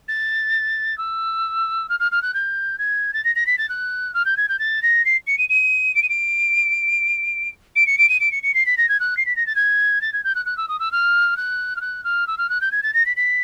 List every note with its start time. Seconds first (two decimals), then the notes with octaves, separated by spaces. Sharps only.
0.08 A6
0.98 E6
1.89 F6
2.00 F6
2.11 F6
2.22 F#6
2.34 G6
2.78 G#6
3.13 A6
3.24 A#6
3.35 A#6
3.46 B6
3.58 A6
3.69 F#6
4.14 F6
4.25 G6
4.37 G#6
4.49 G6
4.59 A6
4.82 A#6
5.05 C7
5.27 C#7
5.38 D#7
5.49 D#7
5.95 D7
6.02 D#7
6.09 D7
7.76 D7
7.86 C#7
7.98 D7
8.09 D#7
8.20 D7
8.31 C#7
8.43 C#7
8.54 C7
8.66 B6
8.77 A#6
8.89 G#6
9.00 F#6
9.17 C7
9.26 B6
9.36 A#6
9.46 A6
9.55 G#6
10.01 A6
10.13 G#6
10.24 G6
10.35 F#6
10.46 F#6
10.57 E6
10.68 D#6
10.79 E6
10.92 F6
11.37 F#6
11.76 F6
11.81 F#6
12.04 F6
12.27 E6
12.38 F6
12.49 F#6
12.61 G6
12.72 G#6
12.83 A6
12.94 A#6
13.06 B6
13.16 B6